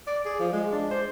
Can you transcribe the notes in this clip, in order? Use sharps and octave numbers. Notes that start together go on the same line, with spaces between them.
D5
G#4
F3
G#3
D4
C5